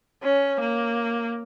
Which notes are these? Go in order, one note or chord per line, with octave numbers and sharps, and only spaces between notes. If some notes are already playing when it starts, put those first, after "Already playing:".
C#4
A#3